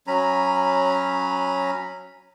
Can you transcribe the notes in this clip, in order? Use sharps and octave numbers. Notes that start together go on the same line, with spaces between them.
F#3 C#4 A#5 B5